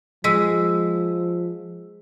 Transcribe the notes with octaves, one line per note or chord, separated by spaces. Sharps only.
F3 G#3 E6 B6